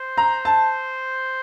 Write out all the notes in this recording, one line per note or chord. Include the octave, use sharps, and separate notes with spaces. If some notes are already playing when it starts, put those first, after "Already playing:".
Already playing: C5
A#5
A5